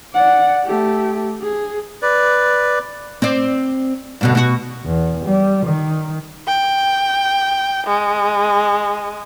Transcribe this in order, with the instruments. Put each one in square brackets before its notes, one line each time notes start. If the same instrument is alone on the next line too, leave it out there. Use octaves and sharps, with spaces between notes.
[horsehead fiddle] D5 F#5
A3 G4
G#4
[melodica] B4 D5
[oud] C4 D5
G2 B2 D3
B2 F#4
[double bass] E2
G3
D#3
[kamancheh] G5
G#3